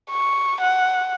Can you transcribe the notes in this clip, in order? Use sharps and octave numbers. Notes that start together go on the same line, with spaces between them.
C#6
F#5